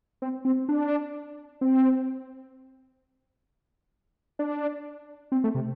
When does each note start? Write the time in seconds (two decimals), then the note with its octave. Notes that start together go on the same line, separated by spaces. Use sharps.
0.22 C4
0.45 C4
0.69 D4
1.61 C4
4.39 D4
5.32 C4
5.44 A3
5.55 C3